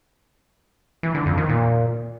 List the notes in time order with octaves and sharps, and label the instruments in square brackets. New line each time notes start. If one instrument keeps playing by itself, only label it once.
[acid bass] E3
D3
F2
D#3
A#2